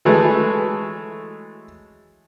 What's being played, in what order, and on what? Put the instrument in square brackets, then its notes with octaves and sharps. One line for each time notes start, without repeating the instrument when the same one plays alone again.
[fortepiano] E3 F#3 G#3 A3